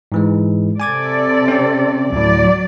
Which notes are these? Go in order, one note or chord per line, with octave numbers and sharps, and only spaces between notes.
G#2 E3 G#3
C3 A4 D5 G#5 D6 G#6
C4 C#4
D2 A2 F#3 D5